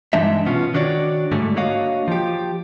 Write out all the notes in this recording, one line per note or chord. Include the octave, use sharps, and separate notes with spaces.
G2 E3 G#3 D4 D#4 E5
B2 B3 C#4 F4
D#3 D4 F#4 C#5 D5
G#2 D3 G3 A3
A#3 D4 F#4 C#5 D#5 F5
F3 G4